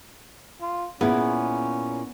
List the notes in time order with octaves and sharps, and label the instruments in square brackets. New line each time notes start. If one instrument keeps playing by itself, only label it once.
[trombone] F4
[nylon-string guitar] A#2 E4 G#4 [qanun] B3 [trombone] C#4